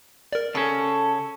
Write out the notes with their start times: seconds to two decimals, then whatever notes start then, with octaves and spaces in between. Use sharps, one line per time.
0.33 A#4 D5
0.55 C#3 C#4 A4